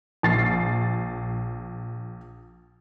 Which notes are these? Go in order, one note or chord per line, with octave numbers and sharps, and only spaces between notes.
A#1 A6 C7